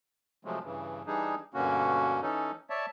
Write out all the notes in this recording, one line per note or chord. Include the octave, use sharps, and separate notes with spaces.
C3 F3 F#3 G#3 A3
G2 C#3 E3
E3 G3 D4 D#4 G#4
G2 B2 D3 A#3 C#4 F#4
E3 C#4 D#4 A4
C#5 D5 E5 A5